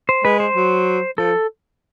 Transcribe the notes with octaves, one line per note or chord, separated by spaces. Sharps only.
C5
G#3 B4
C5
F#3
F3 A4